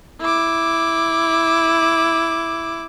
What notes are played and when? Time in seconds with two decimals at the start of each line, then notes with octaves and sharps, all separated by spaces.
0.21 E4 D6